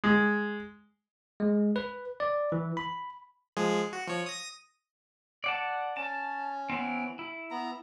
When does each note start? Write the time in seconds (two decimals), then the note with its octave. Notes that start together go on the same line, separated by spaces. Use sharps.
0.04 G#3
1.40 G#3
1.76 B4
2.20 D5
2.52 E3
2.77 B5
3.57 F3 G#3 G#4
3.93 F#4
4.08 F3 C#5
4.26 D#6 A#6
5.44 D5 F#5 A5
5.97 C#4 A5
6.70 E3 B3 C4
7.19 E4
7.51 B3 A#5